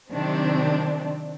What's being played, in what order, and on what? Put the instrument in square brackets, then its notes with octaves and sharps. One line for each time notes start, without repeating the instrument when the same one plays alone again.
[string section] C3 D#3 F3 F#3 C4 D4